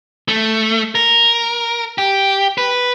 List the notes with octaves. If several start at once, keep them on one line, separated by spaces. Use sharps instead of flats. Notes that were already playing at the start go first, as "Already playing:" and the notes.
A3
A#4
G4
B4